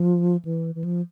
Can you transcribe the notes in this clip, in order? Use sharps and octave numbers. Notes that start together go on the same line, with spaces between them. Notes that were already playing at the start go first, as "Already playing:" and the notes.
Already playing: F3
E3
E3
F3